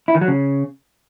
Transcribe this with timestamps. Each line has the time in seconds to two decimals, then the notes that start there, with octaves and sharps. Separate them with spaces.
0.08 E4
0.15 D#3
0.21 F#3
0.28 C#3